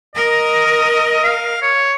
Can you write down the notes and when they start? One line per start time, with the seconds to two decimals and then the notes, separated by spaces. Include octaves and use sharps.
0.15 A#4 D#5
1.24 F5
1.62 C#5